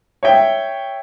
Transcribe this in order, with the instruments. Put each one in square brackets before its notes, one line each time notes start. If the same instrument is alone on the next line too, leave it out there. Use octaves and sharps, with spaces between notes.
[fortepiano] C#5 E5 G5